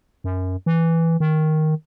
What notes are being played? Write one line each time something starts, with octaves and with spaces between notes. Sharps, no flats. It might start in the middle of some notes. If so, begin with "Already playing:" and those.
F#2
E3
D#3